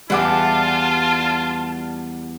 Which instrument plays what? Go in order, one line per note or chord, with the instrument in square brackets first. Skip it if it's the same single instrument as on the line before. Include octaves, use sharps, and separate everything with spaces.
[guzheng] E2 E3 G5 [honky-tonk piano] G3 F#5 D6 [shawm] F4 [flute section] A5